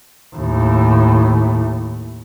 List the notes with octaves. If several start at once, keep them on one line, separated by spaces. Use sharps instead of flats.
D#2 A2